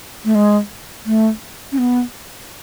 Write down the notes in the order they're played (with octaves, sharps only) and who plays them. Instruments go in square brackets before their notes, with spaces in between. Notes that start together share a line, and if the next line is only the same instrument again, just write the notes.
[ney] A3
G#3
A3
C#4
B3